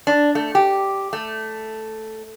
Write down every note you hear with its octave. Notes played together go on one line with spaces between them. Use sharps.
D4
A3
G4
A3